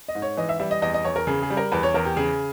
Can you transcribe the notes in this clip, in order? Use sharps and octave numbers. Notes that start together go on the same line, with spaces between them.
D#5
G#2
C#5
E3 D#5
E5
G3 E5
D#5
E2 D#5
D#5
E2 C#5
A#4
C#3 G#4
G#4
G3
A#4
E2 B4
C#5
E2 A#4
G4
C#3 G#4